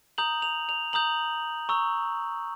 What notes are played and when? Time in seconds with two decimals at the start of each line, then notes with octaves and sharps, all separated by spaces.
0.18 A#5 D#6 G6 F#7
0.42 F7
0.69 F7
0.93 A#5 D#6 G6 F#7
1.69 A#5 C#6 E6